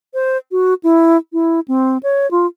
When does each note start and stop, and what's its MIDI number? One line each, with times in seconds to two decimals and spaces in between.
0.14 0.37 72
0.51 0.74 66
0.83 1.17 64
1.33 1.60 64
1.68 1.98 60
2.03 2.29 73
2.31 2.46 65